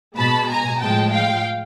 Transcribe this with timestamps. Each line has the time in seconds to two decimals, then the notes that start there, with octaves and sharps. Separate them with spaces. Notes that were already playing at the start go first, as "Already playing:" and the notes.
0.16 B2 G#3 A5 B5
0.48 G#5 A#5
0.80 A2 F3 G#3 G5 A5
1.13 F5 G5